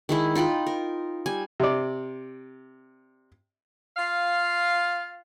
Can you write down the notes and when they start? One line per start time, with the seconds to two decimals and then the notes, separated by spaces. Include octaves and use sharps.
0.09 D#3 G#3 E4
0.35 D#4 F4 G5 B5
0.67 A#4
1.26 G3 G#5
1.60 C3 D5
3.97 F4 F5